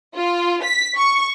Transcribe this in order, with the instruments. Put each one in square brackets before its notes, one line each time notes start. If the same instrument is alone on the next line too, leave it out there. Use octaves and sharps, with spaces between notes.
[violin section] F4
B6
C#6